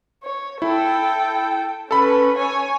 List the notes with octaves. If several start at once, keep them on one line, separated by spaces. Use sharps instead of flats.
C#5
E4 A4 G5
C#4 A4 B4 B5
C#5 G#5